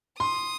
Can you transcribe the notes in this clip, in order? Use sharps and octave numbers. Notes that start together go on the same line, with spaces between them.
C6 D#6